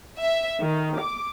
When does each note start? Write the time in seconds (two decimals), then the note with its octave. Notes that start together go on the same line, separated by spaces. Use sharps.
0.18 E5
0.61 D#3
0.99 D6